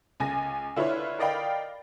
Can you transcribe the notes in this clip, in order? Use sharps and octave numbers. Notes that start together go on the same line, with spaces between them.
C#2 G#5 A#6
D3 E4 F4 B4 C#5
A#4 D5 D#5 F5 G5 B5